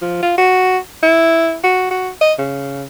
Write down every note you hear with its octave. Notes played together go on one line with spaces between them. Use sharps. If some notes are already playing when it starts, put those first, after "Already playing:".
F3
F4
F#4
E4
F#4
F#4
D#5
C#3